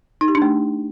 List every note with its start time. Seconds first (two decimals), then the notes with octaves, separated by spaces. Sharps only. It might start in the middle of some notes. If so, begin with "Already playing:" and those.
0.21 D#4
0.28 G4
0.35 D4
0.42 A3